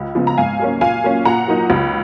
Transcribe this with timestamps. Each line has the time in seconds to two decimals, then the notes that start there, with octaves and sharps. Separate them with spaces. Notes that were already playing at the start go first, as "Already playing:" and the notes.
Already playing: C#2
0.15 C#3 F3 B3
0.27 A#5
0.38 G#2 F5 G#5
0.59 F#3 A#3 C#4
0.81 A#2 F5 G#5
1.04 F#3 A#3 C#4
1.25 A#2 F#5 A#5
1.48 F#3 A#3 D#4
1.70 C#2